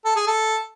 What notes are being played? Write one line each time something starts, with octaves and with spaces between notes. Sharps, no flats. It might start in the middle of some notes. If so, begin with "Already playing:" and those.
A4
G#4
A4